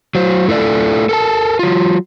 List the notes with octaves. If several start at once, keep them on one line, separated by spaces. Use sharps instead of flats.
F#3 C5
A3 E4 F4 A4 D5
A4 A#4 A5
F#3 F4